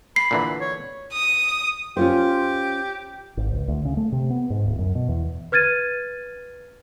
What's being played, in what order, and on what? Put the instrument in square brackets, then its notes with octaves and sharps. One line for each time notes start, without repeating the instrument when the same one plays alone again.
[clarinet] B5 [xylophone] C7
[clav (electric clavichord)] A#2 D3 E3
[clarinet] C#5
[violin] D#6
[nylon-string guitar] C#4 F4 C5 [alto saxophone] G4
[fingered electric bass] G#1
C#2
D2
C#3
A3
C3
B3
G#2
D1
F#2
B2
E2
[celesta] B4 F6 G#6 A6 D#7